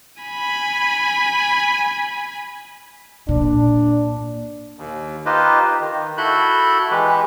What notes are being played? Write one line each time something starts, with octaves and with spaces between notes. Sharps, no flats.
G#5 B5
A#2 D4
D#2
D#4 F4 G4 B4 C5 D#5
D#3
E4 F#4 A4 B5 F#6 G6
E3 G#3 G4 B4